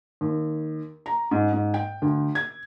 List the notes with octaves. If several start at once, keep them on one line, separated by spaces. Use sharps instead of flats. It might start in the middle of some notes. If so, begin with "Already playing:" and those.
D#2
A#5
G#2
G#2
G5
D2
G#6